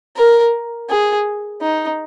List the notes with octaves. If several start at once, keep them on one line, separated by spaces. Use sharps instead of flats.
A#4
G#4
D#4